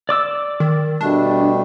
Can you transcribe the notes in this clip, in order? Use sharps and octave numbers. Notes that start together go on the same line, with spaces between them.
D5 D6 E6
D#3
B2 G3 A3 D4